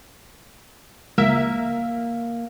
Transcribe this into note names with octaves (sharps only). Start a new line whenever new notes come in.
C#2 A#3 A#4 E5